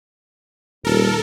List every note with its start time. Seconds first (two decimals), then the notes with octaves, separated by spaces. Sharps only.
0.85 D#1 A4 A#4